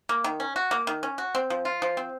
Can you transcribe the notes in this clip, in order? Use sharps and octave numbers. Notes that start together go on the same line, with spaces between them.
A#3
D#3
C#4
F#4
A#3
D#3
C#4
F#4
C4
F3
F4
F3
C4